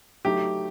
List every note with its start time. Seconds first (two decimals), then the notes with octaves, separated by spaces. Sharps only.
0.25 F#3 A3 D#4 G4